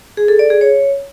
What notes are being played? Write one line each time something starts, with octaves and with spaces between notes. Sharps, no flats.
G#4
A4
D5
G#4
C#5